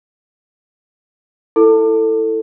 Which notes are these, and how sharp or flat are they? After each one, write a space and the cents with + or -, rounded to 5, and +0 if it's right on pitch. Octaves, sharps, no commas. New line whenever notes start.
E4 +0 A4 +15